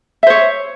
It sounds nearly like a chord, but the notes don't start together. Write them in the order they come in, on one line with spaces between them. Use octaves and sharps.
E5 C5 C#5